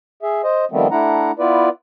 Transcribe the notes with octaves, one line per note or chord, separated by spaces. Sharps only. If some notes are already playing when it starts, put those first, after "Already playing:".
G#4 E5
C5 D#5
D#3 F3 G3 A3 B3 C4
A3 D4 E4 F#5 A#5
B3 E4 F4 B4 D5